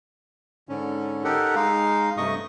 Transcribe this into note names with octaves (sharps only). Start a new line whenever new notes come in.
G#2 D3 C#4
D#4 G4 A4 A#4 F#5
G#3 D#4 F5
G2 C3 A3 D#5 C#6 D#6